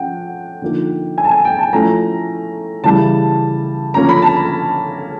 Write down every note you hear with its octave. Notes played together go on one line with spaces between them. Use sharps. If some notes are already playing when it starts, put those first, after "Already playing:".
Already playing: F3 C#4 F4 F#5 G5
D3 F3 A#3 D#4
G#5
A5
G#5
G5
A5
F3 A3 C#4 E4 A#5
C#3 E3 G3 A5
D3 F3 A#3 C#4 A#5
B5
A5
B5